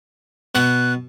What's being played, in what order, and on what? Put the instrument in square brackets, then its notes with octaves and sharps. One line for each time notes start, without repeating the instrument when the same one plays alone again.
[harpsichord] B2 [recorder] F#6